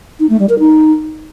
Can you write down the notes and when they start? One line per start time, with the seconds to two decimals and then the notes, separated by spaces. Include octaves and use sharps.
0.20 D#4
0.30 A3
0.39 G3
0.49 A#4
0.59 D#4